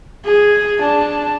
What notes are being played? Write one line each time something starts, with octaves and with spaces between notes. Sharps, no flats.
G#4
D4 A5